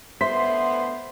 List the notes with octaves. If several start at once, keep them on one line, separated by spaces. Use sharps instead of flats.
A2 D3 B3 C5 E5 C6 B6